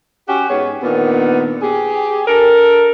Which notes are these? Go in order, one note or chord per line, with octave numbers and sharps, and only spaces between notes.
C#4 F#4 G4
G#2 B3 G#4 C#5
A#2 D3 D#3 B3
G4 G#4
D4 A4 A#4